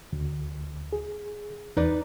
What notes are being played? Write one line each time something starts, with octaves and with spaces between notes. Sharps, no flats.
D2
G#4
E2 D#4 B4 D5